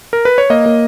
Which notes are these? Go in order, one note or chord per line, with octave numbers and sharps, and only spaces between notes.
A#4
B4
C#5
A#3 D#5
A#3